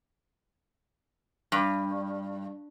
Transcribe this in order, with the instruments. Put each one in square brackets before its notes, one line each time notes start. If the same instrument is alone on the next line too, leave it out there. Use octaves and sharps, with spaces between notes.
[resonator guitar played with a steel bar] G2